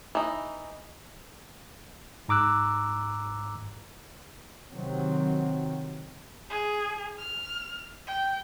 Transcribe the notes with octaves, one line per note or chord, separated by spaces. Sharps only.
E3 D#4
G#2 A#5 D6 E6 F#6
C3 D#3 F#3 C4
G#4
F6
G5